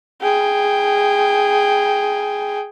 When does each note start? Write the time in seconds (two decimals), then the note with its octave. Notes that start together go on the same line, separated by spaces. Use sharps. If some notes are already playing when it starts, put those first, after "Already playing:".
0.22 G#4 G5